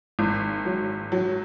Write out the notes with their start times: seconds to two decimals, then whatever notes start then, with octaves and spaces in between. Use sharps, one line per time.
0.19 G#1
0.65 F#3
1.12 F#3